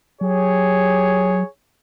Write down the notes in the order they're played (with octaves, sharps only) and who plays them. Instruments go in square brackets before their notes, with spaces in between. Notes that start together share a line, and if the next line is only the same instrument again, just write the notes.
[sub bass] F#3 [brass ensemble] G4 G#4 C#5